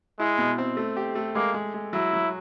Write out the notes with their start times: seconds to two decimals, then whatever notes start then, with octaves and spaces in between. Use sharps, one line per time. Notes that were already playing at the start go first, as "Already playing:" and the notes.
0.19 G#3 E4
0.38 B2
0.58 C4
0.77 A3
0.97 G4
1.15 A3
1.35 G#3 A#3
1.54 G#3
1.74 G#3
1.93 F#3 E4
2.13 F#3